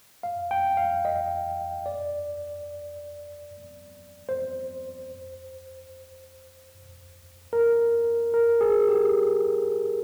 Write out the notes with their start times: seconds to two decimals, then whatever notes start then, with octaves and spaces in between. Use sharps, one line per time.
0.23 F5
0.51 G5
0.77 F5
1.05 D#5
1.86 D5
4.29 C5
7.53 A#4
8.34 A#4
8.61 G#4
8.88 G4